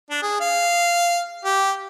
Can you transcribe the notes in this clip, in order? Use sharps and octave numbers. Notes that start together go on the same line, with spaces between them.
D4
G#4
F5
G4